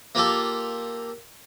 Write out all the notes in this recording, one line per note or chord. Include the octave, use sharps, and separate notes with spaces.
A#3 F4 G4 A4